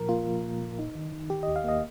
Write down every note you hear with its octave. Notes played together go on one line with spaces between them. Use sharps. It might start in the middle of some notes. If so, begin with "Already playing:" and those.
Already playing: A#2 F3 A#4
A#3 F4
F3
A#2
A#2
D#4
D#3
D#3
D#3 G4
D#5
D#2
F5
A#3 D#5